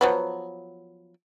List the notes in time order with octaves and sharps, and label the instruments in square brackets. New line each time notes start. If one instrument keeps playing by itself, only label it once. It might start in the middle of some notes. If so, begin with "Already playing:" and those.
[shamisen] F3 F#3 B3